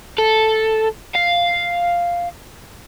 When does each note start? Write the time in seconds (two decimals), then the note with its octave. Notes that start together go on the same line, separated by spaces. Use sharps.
0.18 A4
1.15 F5